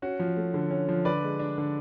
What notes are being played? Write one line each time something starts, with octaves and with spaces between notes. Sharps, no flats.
C#4 F#4
F3
A3
D3
C#4
F3
D3 B4 D5
G#3
D4
D3